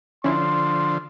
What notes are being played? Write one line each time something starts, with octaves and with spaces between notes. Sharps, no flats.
D3 F3 C#4 E4 C6